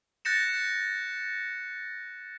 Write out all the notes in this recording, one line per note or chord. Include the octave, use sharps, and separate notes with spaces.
F#6 G6 A6 A#6 C#7 E7